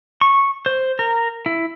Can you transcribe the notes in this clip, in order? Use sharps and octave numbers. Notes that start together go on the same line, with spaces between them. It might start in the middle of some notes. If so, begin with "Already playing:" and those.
C#6
C5
A#4
E4